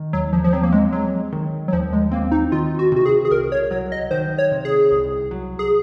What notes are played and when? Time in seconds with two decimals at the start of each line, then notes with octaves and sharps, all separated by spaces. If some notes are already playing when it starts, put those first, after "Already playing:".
Already playing: D#3
0.13 D#2 F#3
0.33 F3
0.44 F3
0.53 F#3 C4
0.63 A#3
0.72 G#3
0.92 F#3 G#3
1.33 D#3
1.68 F#3
1.73 D#2 F3
1.93 G#3
2.12 A#3 C4
2.31 D#4
2.52 D#3 F4
2.79 F#4
2.92 C3 F#4
3.06 G#4
3.25 G#4
3.31 C2 A#4
3.52 C#5
3.71 F#3 C#5
3.92 D#5
4.11 D#3 C5
4.38 C#5
4.52 C3
4.65 G#4
4.91 C2
5.31 F#3
5.59 G#4